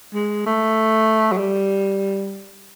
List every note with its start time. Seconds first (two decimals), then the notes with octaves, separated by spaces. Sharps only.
0.14 G#3
0.46 A3
1.32 F#3
1.38 G3